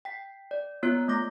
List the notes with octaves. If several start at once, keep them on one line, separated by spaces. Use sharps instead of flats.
G5 B6
D5
A#3 B3 F4 C#5 F#6
A3 A#3 D6 A#6